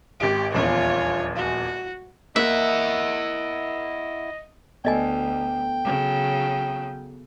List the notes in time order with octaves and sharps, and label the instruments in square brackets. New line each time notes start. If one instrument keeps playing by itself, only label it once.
[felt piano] G#1 D7 [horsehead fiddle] G4
[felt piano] D#1 A#1 E2 [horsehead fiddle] F4 C#5
[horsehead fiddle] F#4
[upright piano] A#3 [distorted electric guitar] E4 F#5 [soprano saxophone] D#5 [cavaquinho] E5
[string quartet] D2 [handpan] B3 A4 [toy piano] D5 D#5 G#5 [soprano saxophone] G5
[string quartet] C#3 F#3